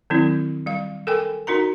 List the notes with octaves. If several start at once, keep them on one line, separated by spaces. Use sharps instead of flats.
D#3 F#3 C4 E4
G3 F5
A4 A#4 G5 G#5
D#4 F#4 A#4 A#5